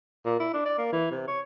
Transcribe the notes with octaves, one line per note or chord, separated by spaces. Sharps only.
A#2
E4
D4
D5
A#3
E3
C3
C#5